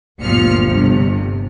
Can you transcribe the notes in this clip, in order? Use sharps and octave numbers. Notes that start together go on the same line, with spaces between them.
G1 D2 A#2 F3 F6 C#7
G1 G2 C3